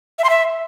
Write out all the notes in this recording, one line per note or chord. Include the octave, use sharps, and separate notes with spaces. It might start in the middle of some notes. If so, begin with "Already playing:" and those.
E5
C6
E5